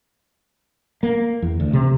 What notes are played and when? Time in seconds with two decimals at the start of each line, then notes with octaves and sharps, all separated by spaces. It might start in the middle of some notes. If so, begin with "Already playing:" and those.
1.03 A#3
1.42 E2
1.60 D2
1.73 C3